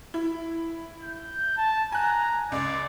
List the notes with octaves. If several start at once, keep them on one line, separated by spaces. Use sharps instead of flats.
E4
G6
A5
G#5 A#5 F#6
C#2 D5